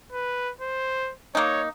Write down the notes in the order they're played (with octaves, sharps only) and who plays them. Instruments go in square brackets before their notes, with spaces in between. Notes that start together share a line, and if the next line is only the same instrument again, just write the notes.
[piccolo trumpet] B4
C5
[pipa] A#3 D#4 [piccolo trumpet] C#5